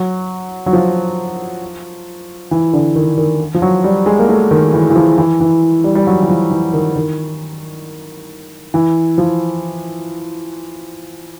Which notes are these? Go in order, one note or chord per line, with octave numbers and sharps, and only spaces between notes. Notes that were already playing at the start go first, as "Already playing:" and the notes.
Already playing: F#3
F#3
F3
E3
D3
D#3
D#3
F3
F#3
G3
G#3
A#3
A3
D#3
E3
E3
F3
E3
E3
G3
G3
F#3
E3
F3
E3
D#3
D#3
E3
F3